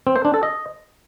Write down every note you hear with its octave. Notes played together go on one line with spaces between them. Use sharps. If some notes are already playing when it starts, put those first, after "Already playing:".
C4
C5
D4
A4
D#5